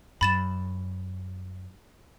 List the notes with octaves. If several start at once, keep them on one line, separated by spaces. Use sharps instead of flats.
F#2 B5 A6 E7